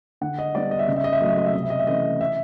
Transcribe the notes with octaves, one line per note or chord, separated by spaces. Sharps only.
D3 F#5
D#5
G3 B3 D4 D5
D#5
E5
C#3 D#5
E5
D#5
E5
F#3 A3 D#5
E5
D#5
E5
C3 D#5
E5
D#5
E5
E3 A3 C#4 D#5
E5